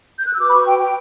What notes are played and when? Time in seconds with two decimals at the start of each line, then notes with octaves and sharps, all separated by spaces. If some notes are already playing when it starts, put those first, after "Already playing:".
0.19 G6
0.26 F#6
0.33 E6
0.39 F#4 B4 D6
0.48 B5
0.53 C#6
0.66 G5
0.79 G5